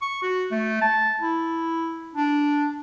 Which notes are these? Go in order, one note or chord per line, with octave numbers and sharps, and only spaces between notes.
C#6
F#4
A3
A5
E4
D4